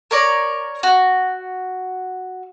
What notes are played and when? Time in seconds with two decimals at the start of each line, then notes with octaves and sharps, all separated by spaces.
0.11 A#4 C#5 D5
0.83 F#4